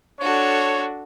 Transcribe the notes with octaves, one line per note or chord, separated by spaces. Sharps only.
D4 F#4 A4 C#5